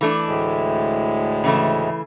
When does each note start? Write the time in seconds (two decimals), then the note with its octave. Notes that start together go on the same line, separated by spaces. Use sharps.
0.01 E3 A3 D4
0.27 D2 A2 G#3
1.44 C#3 E3 A3